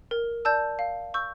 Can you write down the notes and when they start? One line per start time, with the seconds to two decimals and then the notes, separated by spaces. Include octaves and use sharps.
0.11 A#4
0.45 D5 A5 E6 G6
0.79 F5
1.14 C#6 E6 G6